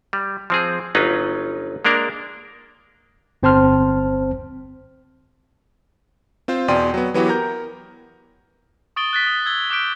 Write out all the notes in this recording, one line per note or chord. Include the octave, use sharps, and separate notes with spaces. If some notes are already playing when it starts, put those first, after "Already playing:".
G3
F3 C4 G#4
G1 F#3 C#4 D#4 F4 B4
G#3 A#3 D4 A#4
G1 C4 C5 A5 C6 F6
C4 F4 C5
E2 B2 D5 G5 C6 D#7
F#3 B3
E3 F#3 B3 E4 F#4 G4
A#4 A#5 G6
C#6 D#6 A6 D7 G7
F#6 A6 B6
D#6
E6 G#6 G7
D6 F#6 G6 B6 D7